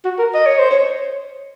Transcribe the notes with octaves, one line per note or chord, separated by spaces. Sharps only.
F#4
A#4
D#5
C#5
C5
C#5